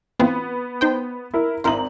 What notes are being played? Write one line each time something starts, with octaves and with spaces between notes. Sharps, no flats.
E3 B3 C4 F4
D#4 C5 G5
E4 A#4
G#1 E4 A#4 C5 A#5 F#7